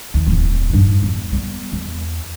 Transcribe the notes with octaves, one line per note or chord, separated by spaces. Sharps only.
D#2
D1 E2
G2 D#4
E2
G3 B3
E2